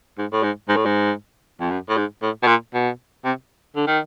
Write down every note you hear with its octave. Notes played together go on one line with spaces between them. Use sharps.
G#2
A2
G#2
G#2
A2
G#2
F2
F#2
A2
G#2
A2
B2
A#2
B2
C3
D3
D#3